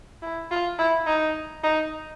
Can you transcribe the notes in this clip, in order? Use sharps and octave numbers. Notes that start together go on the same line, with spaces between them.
E4
F4
E4
D#4
D#4